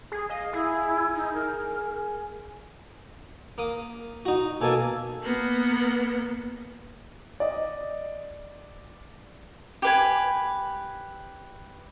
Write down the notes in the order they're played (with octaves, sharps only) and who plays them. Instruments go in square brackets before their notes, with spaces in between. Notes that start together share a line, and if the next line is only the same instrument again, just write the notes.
[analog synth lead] G#4
[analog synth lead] D#5 [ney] F5
[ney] E4 [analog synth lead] G#4
[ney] D#4
A#4
[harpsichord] A#3 D#6
D#4 F#4
[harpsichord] B2 [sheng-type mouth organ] A#3 A4 G#5
[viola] A#3 B3
[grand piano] D5 D#5
[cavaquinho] G4 B4 G#5